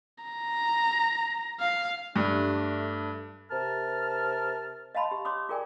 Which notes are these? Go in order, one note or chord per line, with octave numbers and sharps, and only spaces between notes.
A#5
F5
G2 A3 D4
C3 A#4 A5 F6
D#5 F5 A5 B5 C6
G4
C#5 C6 D6 D#6
F4 G#4 A#4 D5 G5 G#5